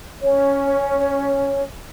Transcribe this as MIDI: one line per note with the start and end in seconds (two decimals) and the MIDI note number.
0.22 1.63 61
0.22 1.63 73